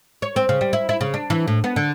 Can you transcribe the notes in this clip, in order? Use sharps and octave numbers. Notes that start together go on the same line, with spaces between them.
C#5
C4
C#3
G3
E4
E4
C#3
D4
E3
A2
B3
D3